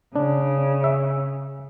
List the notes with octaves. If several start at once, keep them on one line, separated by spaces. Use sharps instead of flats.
C#3 D4
E5